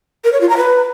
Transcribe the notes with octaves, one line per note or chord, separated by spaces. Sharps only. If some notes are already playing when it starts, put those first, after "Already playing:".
A#4
C#5
F4
A#5
B4